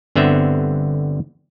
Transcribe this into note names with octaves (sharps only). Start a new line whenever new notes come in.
G1 D3 B3 C4 E5